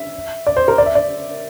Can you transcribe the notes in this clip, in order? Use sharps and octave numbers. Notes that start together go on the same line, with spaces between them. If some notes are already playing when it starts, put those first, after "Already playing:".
Already playing: E5
D5
C5
A#4
D5
E5
D5